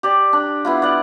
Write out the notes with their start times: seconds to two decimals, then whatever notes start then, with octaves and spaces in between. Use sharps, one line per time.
0.03 G4 D5
0.33 D4
0.65 B3 E4 F4
0.82 D5 F#5